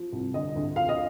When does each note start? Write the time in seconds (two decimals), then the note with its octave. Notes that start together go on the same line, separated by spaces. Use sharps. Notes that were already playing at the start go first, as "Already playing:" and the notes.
Already playing: F3
0.13 C2
0.34 D3 D#5
0.55 D2
0.76 F3 F5
0.89 D#5